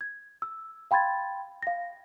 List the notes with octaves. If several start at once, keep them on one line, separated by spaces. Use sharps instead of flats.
G#6
E6
F5 G5 B5 C6 G#6 A6
F5 A#6